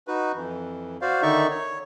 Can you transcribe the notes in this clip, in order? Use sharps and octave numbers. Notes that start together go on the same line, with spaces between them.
D#4 F#4 B4
F2 E3
F#4 C5 D5 F5
D3 D#3 D#4 D5 E5 C#6
C#5